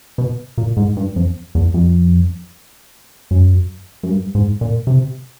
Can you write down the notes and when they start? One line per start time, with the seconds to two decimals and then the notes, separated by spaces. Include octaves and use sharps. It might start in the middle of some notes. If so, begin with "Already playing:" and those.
0.18 B2
0.58 A#2
0.77 G#2
0.97 G2
1.16 F2
1.55 E2
1.74 F2
3.31 F#2
4.03 F#2
4.09 G2
4.35 G#2
4.61 A#2
4.87 C3